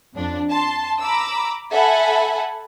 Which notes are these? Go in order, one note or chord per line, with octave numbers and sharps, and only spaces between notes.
F2 D4
A5 C6
A#5 B5 D6 E6
A4 E5 F#5 G#5 A5 B5